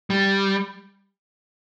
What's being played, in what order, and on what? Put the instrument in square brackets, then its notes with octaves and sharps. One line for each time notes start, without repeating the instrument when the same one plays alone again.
[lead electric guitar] G3